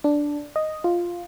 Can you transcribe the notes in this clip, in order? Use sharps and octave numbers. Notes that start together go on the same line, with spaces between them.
D4
D#5
F4